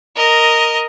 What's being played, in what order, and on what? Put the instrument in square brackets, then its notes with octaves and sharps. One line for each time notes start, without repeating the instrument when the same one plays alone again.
[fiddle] A#4 D#5